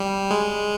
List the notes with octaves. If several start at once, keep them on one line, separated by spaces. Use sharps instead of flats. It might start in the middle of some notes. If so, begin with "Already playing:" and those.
Already playing: G3
G#3